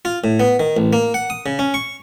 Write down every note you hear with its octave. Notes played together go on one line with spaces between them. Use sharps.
F4
A2
B3
D#3
A1
A#3
F#5
D#6
C#3
C#4
C#6